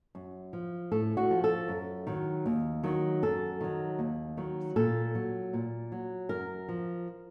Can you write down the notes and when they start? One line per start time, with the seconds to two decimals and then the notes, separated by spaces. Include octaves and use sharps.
0.15 F#2
0.53 F3
0.92 A2 A4
1.17 F#4
1.30 F3
1.44 A4
1.68 F#2
2.07 D#3 F#3
2.46 D#2
2.83 D#3 F#3
3.23 F#2 A4
3.61 D#3 F#3
3.99 D#2
4.37 D#3 F#3
4.76 A#2 A4
5.15 F#3
5.53 A#2
5.92 F#3
6.29 F#2 A#4
6.69 F3